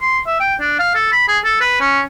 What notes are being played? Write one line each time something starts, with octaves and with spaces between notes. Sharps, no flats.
C6
E5
G5
D4
F5
A4
B5
G#4
A4
B4
C#4